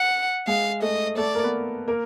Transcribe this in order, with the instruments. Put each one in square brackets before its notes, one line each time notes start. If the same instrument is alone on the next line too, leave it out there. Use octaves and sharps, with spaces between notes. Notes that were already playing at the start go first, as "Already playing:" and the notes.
Already playing: [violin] F#5
[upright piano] G#3 G#4 [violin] F5
[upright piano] A3 A4 [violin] D#5
[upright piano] A3 A4 [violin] D5
[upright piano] A#3 A#4
B3 B4
A#3 A#4